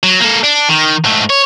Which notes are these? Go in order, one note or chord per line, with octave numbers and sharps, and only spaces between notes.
F#3
A#3 A4
D4
D#3
G#2 A3
C#5